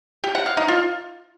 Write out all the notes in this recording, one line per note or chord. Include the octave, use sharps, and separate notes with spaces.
G4
F#5
F5
D#4
F4